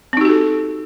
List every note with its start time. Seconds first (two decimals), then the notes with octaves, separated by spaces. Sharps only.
0.13 C4
0.17 D#4
0.21 G4
0.25 F#4
0.29 A4